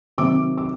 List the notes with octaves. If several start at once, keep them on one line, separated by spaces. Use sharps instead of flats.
C3 D#3 F#3 D6
D6